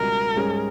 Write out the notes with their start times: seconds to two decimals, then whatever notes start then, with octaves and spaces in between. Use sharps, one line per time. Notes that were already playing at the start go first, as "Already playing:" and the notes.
Already playing: C#2 B2 G3 A#4
0.36 G#2 G3 C#4 G#4